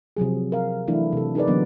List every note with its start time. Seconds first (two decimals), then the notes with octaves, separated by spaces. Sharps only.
0.17 C3 F3 F#3 G#4
0.52 A#4 F5
0.88 E3 F#3 A3 D4 E4
1.13 C3 A4
1.35 D#4 G#4 A#4 B4 D5
1.47 D3 E3 F#3 A#3 B3 D4